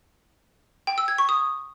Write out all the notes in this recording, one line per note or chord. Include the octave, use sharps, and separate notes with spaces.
G5
E6
G#6
C#6
D#6